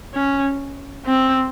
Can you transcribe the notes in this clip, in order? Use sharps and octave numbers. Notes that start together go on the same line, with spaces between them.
C#4
C4